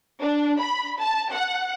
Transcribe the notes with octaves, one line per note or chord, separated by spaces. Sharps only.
D4
B5
A5
F#5